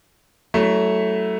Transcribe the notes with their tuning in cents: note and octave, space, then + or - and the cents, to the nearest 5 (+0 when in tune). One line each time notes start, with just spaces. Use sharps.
F#3 +30 A3 +0 E4 +0